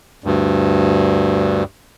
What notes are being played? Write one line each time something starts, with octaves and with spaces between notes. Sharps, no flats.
D2 G2